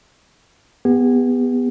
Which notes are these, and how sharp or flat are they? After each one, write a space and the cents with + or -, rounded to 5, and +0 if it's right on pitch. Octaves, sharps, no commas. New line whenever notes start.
B3 +0 G4 +45